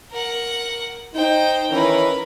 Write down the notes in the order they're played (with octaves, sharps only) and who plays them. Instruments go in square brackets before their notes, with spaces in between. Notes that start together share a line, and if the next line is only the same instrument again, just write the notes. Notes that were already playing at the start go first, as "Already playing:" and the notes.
[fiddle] A#4 F#5
[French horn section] D#4 [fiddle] C5 G5
[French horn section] D#3 E3 C#4 [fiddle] A#4 B4